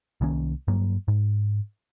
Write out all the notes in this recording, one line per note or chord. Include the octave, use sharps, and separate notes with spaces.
C2 D#3 A#3 C#4
G2 F#3 A#3
G#2